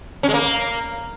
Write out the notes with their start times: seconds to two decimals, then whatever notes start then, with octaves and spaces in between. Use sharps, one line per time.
0.23 C#4
0.29 G#3
0.34 A#3